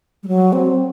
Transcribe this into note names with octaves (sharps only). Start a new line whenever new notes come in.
G3
F#3
C4